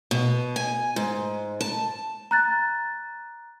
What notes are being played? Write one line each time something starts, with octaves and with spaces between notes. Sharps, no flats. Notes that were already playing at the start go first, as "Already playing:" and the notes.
B2
G#5
G#2
A5
A#5 F#6 A6